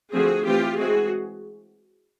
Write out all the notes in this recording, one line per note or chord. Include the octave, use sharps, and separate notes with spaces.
D3 F3 A3 C4 F#4 G#4
E3 A3 C4 F4 G4
E3 G#3 C4 F#4 G#4